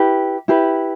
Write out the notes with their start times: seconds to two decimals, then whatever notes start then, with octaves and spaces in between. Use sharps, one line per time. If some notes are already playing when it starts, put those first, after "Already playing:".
Already playing: E4 G4 B4
0.48 E4 G4 B4